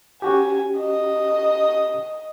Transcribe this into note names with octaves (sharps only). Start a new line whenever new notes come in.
C#4 F#4 G4 G#5
D#5